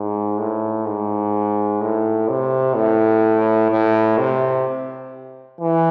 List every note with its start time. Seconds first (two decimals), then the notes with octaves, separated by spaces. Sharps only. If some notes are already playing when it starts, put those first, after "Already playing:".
Already playing: G#2
0.39 A2
0.86 G#2
1.81 A2
2.29 C3
2.76 A2
3.71 A2
4.18 C3
5.61 E3